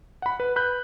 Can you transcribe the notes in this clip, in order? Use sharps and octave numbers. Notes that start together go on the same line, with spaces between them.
F#5 B5
B4
B4 B5 F#6 G6